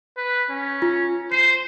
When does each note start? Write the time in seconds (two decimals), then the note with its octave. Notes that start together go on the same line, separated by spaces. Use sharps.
0.17 B4
0.50 C#4
0.82 F4
1.32 C5 C7